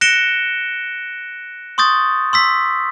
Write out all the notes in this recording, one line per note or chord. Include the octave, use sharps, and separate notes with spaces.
F#6 A#6 C#7 D7 E7 G7
C6 C#6 D#6 G6 A6
C6 E6 B6